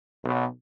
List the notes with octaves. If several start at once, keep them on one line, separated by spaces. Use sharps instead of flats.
B1